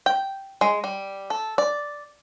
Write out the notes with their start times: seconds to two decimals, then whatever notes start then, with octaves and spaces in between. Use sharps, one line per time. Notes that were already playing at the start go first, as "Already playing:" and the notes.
0.06 G5
0.61 G#3
0.84 G3
1.30 A4
1.58 D5